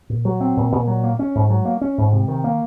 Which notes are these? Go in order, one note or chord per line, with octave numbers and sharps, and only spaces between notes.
A#2
F#3
C4
A#2
A#2
F#3
A#3
C#4
G#2
F#3
A#3
C#4
G#2
C3
D#3
A#3